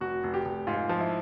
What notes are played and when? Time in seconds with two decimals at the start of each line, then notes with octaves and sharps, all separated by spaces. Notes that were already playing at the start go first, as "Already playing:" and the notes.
0.01 F1 F#4
0.24 F1
0.34 G4
0.45 F1
0.67 G#2 F4
0.89 F3
1.00 E4